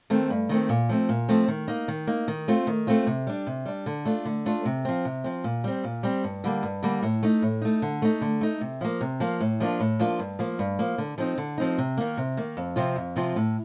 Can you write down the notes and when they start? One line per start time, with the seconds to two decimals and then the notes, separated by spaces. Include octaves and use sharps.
0.10 D#3 A3 C4
0.30 G2
0.49 D#3 A3 C4
0.69 A#2
0.89 F3 A3 C4
1.09 A#2
1.29 F3 A3 C4
1.48 D#3
1.68 A#3 D#4
1.88 D#3
2.07 A#3 D#4
2.28 D#3
2.48 A3 C4 F4
2.67 D#3
2.87 A3 C4 F4
3.07 C3
3.27 G3 D4
3.47 C3
3.66 G3 D4
3.86 D3
4.05 A3 D4 F4
4.25 D3
4.46 A3 D4 F4
4.65 C3
4.85 F3 C4
5.05 C3
5.24 F3 C4
5.44 A#2
5.64 G3 C4
5.84 A#2
6.03 G3 C4
6.24 G2
6.44 D3 G3 A#3
6.63 G2
6.83 D3 G3 A#3
7.03 A2
7.23 A3 D#4
7.42 A2
7.62 A3 D#4
7.82 D3
8.02 A3 D#4
8.21 D3
8.41 A3 D#4
8.61 C3
8.81 F3 A#3
9.01 C3
9.20 F3 A#3
9.40 A2
9.60 F3 A#3 D4 F4
9.80 A2
9.99 F3 A#3 D4 F4
10.19 G2
10.39 F3 A#3
10.59 G2
10.79 F3 A#3
10.98 D3
11.18 F3 C4 D#4
11.38 D3
11.58 F3 C4 D#4
11.78 C3
11.97 D#3 A#3
12.17 C3
12.37 D#3 A#3
12.57 F2
12.76 C3 F3 C4 F4
12.96 F2
13.16 C3 F3 C4 F4
13.36 A2